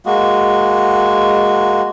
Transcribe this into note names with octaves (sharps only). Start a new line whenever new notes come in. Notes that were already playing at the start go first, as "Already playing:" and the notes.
G#3 A#3 F#4